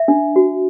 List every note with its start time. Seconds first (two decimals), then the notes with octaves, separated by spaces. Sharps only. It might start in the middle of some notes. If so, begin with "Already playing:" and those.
Already playing: E5
0.08 D4
0.36 F#4